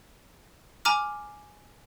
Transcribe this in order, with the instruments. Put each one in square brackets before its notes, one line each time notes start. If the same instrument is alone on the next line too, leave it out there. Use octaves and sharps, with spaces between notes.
[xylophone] G#5 A#5 D6 F6